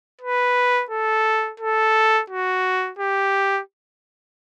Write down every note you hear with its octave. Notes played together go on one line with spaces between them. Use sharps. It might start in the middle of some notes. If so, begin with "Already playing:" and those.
B4
A4
A4
F#4
G4